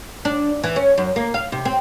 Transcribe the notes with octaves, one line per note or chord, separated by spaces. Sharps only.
D4
E3
C#4
F#2
A#3
F5
C3
C4